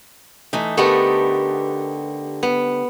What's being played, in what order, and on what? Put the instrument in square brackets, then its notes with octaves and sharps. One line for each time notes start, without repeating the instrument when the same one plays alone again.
[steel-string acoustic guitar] E3 A3 [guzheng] D#4
[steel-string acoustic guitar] D3 G4 A#4 [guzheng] A3 B3
[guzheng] B3